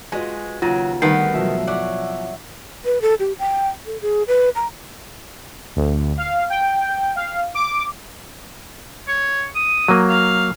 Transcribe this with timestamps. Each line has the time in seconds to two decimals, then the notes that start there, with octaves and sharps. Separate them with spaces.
0.12 G#3 F4 F#4 B4 D#5 G#5
0.62 D#2 C#3 F#3 F4 A6 D#7
1.02 D2 G2 D#3 B3 F#5 C7
1.34 B2 F3 F#3 E5
1.67 E4 C#5 D5 F#5
2.85 B4
3.02 A4
3.20 G4
3.39 G5
3.86 A4
4.02 G#4
4.28 B4
4.55 A#5
5.76 D2
6.18 F5
6.50 G5
7.16 F5
7.55 D6
9.08 C#5
9.55 D#6
9.88 F#3 A#3
10.09 F5